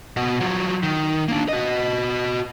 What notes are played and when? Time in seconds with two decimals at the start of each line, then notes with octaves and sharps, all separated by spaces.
0.17 B2 F#4
0.40 F3 F#3
0.83 D#3
1.28 A#3 D4
1.49 F#4 D#5